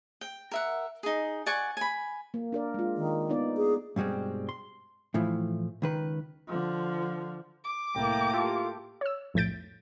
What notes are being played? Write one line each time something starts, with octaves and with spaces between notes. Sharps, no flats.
G5
A#4 E5 F#5
D#4 G#4
D5 F#5 G#5 C#6
G#5 B5
A#3
D4 A#4 D5
G#3 F4
D#3
B3 D#4 D5
G#4
G2 B2 G3 G#3 C4
C6
A2 E3 F3 A3
C#2 D#3 B4
D3 F3
D6
C2 A2 A#3 G5
F4 G4 A4
C#5 E6
B1 F2 A2 G6 A6 D7